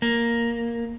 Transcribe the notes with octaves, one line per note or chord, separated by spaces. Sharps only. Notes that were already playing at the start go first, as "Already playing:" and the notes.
A#3